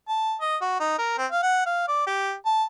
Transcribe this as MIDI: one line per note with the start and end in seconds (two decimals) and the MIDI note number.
0.08 0.35 81
0.41 0.56 75
0.61 0.75 66
0.80 0.98 63
0.99 1.14 70
1.18 1.26 60
1.31 1.43 77
1.43 1.61 78
1.66 1.87 77
1.88 2.06 74
2.07 2.33 67
2.46 2.64 81